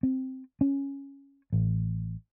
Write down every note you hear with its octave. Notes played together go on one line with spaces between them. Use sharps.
C4
C#4
A1